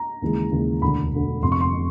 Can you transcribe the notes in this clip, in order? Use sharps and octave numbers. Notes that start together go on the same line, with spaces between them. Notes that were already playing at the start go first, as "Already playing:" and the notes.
Already playing: A#5
D#2 C#3 E3 G#3
D#2 C#3 E3 G#3
E1 D2 D3 B5
E1 D2 D3
F1 F2 C3 C6
C#6
C6
C3